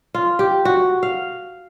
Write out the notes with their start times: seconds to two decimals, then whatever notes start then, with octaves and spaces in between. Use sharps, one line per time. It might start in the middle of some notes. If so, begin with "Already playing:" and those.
0.14 F4
0.39 G4
0.65 F#4
1.03 F5